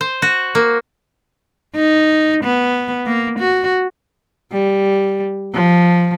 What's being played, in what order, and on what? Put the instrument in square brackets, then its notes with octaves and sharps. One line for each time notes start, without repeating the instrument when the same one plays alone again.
[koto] C5
F#4
A#3
[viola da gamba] D#4
B3
A#3
F#4
G3
F3